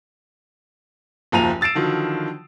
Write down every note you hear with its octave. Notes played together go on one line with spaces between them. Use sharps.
F#1 D#2 F3 A#5 D#7 F7
E6 A6 C7 D7 E7
D3 D#3 F3 F#3